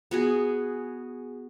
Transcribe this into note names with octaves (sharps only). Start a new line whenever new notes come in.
B3 F#4 G#4